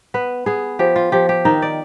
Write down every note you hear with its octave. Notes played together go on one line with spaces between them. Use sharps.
B3 B4
B3 G#4
F3 G4
F4
F3 G4
G4
D#3 D#4
D5